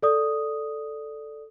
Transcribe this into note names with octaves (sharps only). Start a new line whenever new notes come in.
A4 D5 D#6